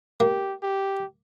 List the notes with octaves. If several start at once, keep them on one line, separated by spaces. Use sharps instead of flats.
A#3 G4
G4